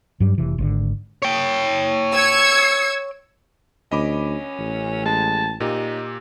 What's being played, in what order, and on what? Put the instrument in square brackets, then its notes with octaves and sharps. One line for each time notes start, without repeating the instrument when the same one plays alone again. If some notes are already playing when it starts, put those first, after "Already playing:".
[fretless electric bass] G2 F#3 G3
F1 C3 E3
G#1 D3
[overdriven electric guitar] C#5 G5
[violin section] E6 G#6 C#7
[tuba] D2 [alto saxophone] C#4 [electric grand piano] D#5 B5 D6
[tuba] A1
[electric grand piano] G#3 [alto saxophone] A5
[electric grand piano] A#2 G4 [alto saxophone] D#4